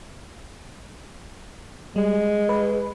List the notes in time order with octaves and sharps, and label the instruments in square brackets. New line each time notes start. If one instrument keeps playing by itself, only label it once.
[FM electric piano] G3 [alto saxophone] G#3
[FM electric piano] B4